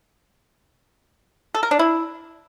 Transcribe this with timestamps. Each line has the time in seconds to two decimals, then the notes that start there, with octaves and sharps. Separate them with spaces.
1.54 A4
1.63 A#4
1.71 D4
1.79 E4